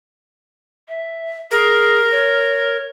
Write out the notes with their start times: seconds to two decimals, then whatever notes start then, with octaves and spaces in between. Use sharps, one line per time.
0.89 E5
1.51 G#4 A#4
2.11 C#5